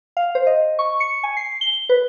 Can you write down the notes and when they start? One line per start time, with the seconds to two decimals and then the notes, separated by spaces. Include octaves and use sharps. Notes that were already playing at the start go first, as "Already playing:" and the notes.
0.17 F5
0.35 C5
0.47 D#5
0.79 C#6
1.00 C#7
1.23 G#5
1.37 C7
1.61 G7
1.89 B4